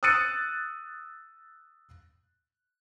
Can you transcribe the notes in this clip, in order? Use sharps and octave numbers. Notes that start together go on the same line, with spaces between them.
D#6 E6 F#6 A6 C#7 D#7